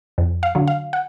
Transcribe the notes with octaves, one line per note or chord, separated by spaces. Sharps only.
F2
F5
D3 F#3
F5
F#5